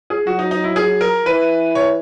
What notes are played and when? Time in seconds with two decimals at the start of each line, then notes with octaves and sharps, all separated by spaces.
0.10 G#4
0.27 F#3 F#4
0.39 D#4
0.51 D#4
0.64 E4
0.76 G#4
1.01 A#4
1.26 E3 B4
1.75 C#5